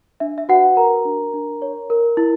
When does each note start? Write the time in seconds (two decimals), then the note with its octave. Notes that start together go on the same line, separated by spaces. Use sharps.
0.20 D4 E5
0.38 E5
0.49 F#4 B4 F#5
0.77 F#4 A#4 A#5
1.05 D4
1.34 D4
1.62 C#5
1.90 A#4
2.17 E4